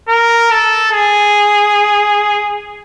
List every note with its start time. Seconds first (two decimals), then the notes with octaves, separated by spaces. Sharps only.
0.09 A#4
0.51 A4
0.92 G#4